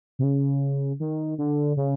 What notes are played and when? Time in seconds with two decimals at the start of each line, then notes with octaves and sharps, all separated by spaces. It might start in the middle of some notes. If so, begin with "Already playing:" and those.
0.19 C3
0.23 C#3
1.00 D#3
1.38 D3
1.77 C#3